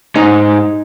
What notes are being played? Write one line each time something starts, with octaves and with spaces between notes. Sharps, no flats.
G#2 D#4